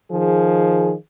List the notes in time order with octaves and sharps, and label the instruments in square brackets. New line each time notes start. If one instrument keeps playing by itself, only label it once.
[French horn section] D#3 F3 G#4